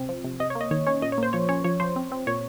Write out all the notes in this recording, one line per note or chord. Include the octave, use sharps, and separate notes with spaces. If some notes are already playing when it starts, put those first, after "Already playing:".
Already playing: C3 C4
F3
C3
C3 D#5
C#5
A#3
D#5
D#3 C#5
C#4 C#5
A#2 D#5
C#5
A#3 C5
F3 C#5
C#4 C#5
F3 C#5
F3 C5
C4
C4
A#2 C#5